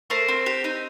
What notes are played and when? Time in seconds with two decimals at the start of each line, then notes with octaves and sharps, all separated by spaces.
0.10 A3 A#4 C5
0.28 C4
0.46 G4
0.64 D#4